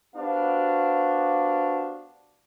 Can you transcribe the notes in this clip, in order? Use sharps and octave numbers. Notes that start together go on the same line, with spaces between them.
B3 D4 F#4 G4 C5 F5